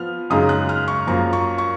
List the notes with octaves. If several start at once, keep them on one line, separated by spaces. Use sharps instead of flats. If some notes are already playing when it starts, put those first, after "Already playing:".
Already playing: F3 B3 F6
F#2 C#3 G#3 D#4 D#6
F#6
F6
C#6
F#2 F3 A#3 A#5
C#6
C#6